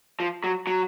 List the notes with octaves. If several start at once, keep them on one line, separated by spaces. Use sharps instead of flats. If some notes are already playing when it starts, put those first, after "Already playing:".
F3
F#3
F#3